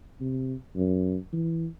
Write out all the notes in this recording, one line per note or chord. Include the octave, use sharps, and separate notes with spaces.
C3
F#2
E3